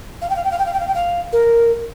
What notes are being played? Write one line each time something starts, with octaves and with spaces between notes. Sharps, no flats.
F5
G5
F5
G5
F5
G5
F5
G5
F5
G5
F5
A#4